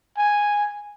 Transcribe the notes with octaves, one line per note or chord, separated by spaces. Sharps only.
G#5